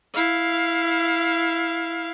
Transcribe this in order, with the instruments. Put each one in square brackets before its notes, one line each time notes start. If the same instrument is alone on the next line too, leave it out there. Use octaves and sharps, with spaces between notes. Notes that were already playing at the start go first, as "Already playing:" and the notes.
[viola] E4 F5